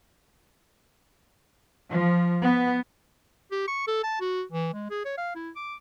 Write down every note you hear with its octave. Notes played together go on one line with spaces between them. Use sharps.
F3
B3
G4
C#6
A4
A5
F#4
E3
G#3
G#4
C#5
F5
E4
D6